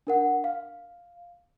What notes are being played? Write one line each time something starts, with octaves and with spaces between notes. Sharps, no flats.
D4 A#4 F#5
F5